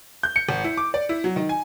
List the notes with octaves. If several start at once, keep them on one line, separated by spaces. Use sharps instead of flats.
G6
C#7
G#1
E4
D6
D5
E4
F#3
D#3
G#5